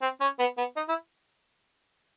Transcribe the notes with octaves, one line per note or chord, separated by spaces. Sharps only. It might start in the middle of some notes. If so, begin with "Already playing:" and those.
C4
C#4
B3
B3
D#4
E4